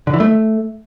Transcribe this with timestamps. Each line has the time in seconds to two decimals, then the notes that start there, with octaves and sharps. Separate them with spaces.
0.07 D3
0.14 E3
0.20 A3